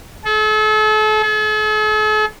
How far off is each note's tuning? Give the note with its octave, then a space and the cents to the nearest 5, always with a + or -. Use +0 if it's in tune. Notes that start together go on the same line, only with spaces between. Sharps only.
A4 -40
A4 -45